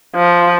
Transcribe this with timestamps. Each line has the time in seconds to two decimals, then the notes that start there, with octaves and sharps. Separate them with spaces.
0.15 F3